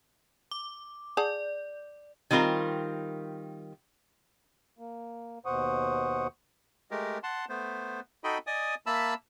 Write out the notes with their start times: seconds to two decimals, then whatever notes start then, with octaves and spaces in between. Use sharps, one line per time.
0.51 D6
1.17 G#4 D5 F#5 A5
2.31 D#3 G3 C4 F4 A#4
4.79 A#3
5.46 D#2 B2 C5 F#5 C#6 D#6
6.91 G#3 A3 G4 A#4
7.23 F#5 A5 C6
7.49 A3 B3 C5
8.24 D#4 F#4 A4 D#5 G5 B5
8.47 D5 D#5 G#5 D#6
8.86 A#3 E5 A5 B5 E6